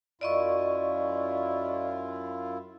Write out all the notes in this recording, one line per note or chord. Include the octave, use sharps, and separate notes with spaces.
F#2 E4 F4 D5 D#5 C#6